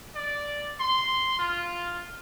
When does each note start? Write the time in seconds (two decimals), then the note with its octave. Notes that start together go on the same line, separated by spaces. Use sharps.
0.15 D5
0.80 C6
1.39 F4